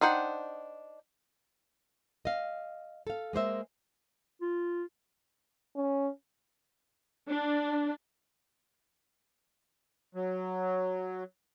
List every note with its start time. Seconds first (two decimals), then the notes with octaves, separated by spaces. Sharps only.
0.01 D4 D#4 C5 F#5 G5
2.25 D#5 F5
3.07 A4 F5
3.33 G#3 A#3 C5 E5
4.42 F4
5.76 C#4
7.28 D4
10.15 F#3